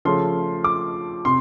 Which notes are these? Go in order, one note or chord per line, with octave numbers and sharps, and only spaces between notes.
C#3 F3 A3 C6
D6
C3 C6